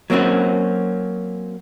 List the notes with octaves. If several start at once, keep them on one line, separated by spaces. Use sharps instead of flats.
F#3 A#3 C4 C#4 F#4